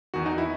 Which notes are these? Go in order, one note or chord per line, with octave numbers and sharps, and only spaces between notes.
E2 D#3 F#4
D#4
E4